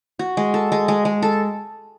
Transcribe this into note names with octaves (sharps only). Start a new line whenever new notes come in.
F#4
G#3
A4
G#3
G#3
G#3
A4